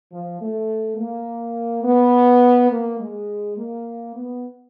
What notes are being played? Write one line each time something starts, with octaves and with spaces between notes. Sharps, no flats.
F3
A3
A#3
B3
A#3
G#3
A#3
B3